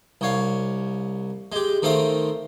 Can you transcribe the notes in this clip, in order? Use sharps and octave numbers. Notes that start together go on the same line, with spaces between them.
C2 C#5 F5
G#3 G4
D#3 A3 C4 F5 D#6